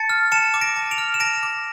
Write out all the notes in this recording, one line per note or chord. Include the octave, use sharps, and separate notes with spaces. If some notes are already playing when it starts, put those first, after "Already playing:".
Already playing: A5 A6 C#7
F6
A5 C#7 E7
D6
A#6 D7
A5
D7 F7
F6
E7
A5 A#6 D7
D6